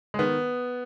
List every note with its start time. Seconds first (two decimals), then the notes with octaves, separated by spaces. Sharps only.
0.14 G#3
0.19 D#3 B3